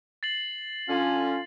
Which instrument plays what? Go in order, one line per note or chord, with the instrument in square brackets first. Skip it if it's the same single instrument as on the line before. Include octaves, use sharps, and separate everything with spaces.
[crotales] A6 C7 F#7
[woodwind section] D3 C#4 [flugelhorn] F4